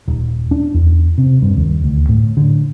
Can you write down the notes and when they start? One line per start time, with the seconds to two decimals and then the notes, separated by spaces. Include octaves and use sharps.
0.08 D#1
0.51 D4
0.74 E2
1.18 C3
1.42 G2
1.57 D#2
1.84 D2
2.09 A2
2.37 D3